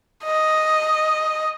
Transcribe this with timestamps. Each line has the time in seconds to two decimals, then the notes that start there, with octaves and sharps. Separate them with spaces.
0.24 D#5